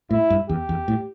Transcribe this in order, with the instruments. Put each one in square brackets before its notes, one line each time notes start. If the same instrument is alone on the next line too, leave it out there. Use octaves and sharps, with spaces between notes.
[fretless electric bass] A2 [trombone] E4
[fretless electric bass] G2
[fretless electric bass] E2 [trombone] G4
[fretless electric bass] E2
A2